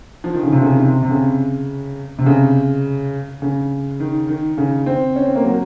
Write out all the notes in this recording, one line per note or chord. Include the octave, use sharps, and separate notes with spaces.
F3
D#3
C#3
C3
C#3
D#3
C3
C3
C#3
C3
C#3
C#3
D#3
D#3
C#3
C4
C#4
C4
A#3
F#3